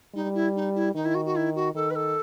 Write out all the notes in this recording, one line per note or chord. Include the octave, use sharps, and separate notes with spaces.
G3 D#4
E4
D#4
E4
D#3 D#4
E4
F#4
F#4
E4
F#4
D#3 A4
B4
A4